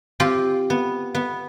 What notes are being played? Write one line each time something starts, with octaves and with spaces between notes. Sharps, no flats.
C4 F4 G4
B3
B3